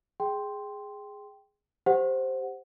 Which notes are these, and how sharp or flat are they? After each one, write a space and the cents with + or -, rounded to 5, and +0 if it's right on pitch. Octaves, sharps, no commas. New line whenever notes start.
G#4 +0 G5 +0 C6 +0
G4 +10 C5 +0 F#5 +0